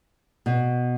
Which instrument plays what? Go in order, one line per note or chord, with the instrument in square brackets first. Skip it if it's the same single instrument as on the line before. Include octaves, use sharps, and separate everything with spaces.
[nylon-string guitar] B2